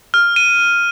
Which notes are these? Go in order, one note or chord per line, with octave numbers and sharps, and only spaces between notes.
F6
D#7